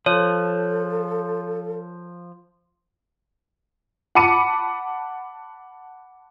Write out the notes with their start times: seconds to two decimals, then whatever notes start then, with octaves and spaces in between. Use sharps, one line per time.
0.06 F3 A4 C#5
4.15 F#5 A5 B5 D6 C#7 D#7